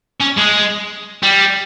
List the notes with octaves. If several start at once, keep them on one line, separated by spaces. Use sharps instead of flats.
C#4
G#3
G3